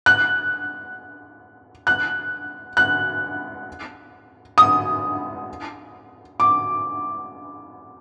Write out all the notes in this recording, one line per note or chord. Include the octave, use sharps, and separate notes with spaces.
F#6
F#6
F#6
D#6
D6